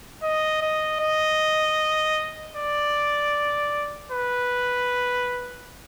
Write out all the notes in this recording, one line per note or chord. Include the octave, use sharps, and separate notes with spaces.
D#5
D#5
D#5
D5
B4